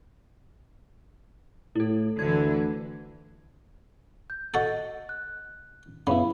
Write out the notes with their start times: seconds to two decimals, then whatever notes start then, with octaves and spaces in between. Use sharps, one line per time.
1.75 A2 E4 A4
2.19 D2 D3 E3 G#6
4.30 G6
4.54 F#4 A4 D#5 A6
5.09 F#6
6.07 F#2 C#3 B3 E4 F5 B5